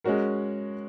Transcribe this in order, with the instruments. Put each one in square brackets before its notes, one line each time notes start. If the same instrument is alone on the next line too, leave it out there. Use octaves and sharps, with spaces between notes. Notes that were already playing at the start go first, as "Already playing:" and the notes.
[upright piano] G#3 C#4 F#4 A#4